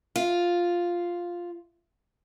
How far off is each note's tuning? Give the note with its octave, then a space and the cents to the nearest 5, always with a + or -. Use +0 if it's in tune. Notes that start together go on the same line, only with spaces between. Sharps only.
F4 +0